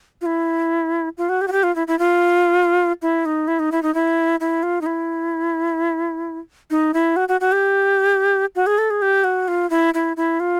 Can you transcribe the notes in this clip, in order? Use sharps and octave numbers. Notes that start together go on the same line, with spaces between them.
F4
E4
F4
F#4
G4
F#4
G4
F4
E4
E4
F4
E4
D#4
E4
D#4
E4
D#4
E4
E4
F4
D#4
E4
D#4
E4
F#4
F#4
F#4
G4
F#4
G#4
A4
G#4
G4
F#4
F4
E4
E4
E4
F4